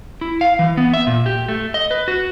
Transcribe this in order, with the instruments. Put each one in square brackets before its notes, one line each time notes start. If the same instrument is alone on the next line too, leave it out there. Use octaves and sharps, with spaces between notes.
[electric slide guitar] E4
F5
E3
B3
E5
A#2
G4
A3
D#5
B4
F#4